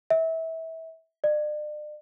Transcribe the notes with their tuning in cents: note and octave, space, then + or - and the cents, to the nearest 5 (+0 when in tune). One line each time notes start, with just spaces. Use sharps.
E5 -25
D5 +40